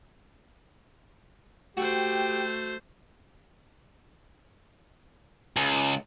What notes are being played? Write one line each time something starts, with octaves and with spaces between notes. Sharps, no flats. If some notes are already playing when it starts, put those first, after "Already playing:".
A3 F#4 G4 C5 G5
C#2